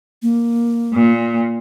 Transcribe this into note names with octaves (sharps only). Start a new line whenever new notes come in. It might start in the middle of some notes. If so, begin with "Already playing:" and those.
A#3
A#2